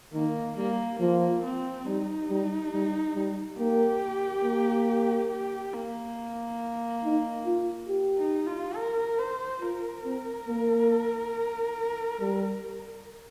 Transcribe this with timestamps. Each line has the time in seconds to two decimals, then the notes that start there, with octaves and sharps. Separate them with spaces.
0.14 D#3 A#3
0.56 G3 A#3
1.00 F3 A#3
1.43 C4
1.86 G3 D#4
2.29 G3
2.72 G3
3.15 G3
3.58 A#3 G4
4.44 A#3
5.31 G4
5.74 A#3
7.04 D#4
7.46 F4
7.89 G4
8.18 D#4
8.47 F4
8.76 A#4
9.19 C5
9.61 F4 A#4
10.05 C4
10.49 A#3
12.20 G3